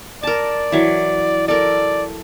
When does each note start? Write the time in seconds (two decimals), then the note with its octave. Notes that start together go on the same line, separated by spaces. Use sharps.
0.23 A#4 D5 A5
0.72 E3 F#3
1.48 A4 A#4 D5